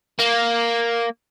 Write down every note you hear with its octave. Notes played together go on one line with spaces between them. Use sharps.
A#3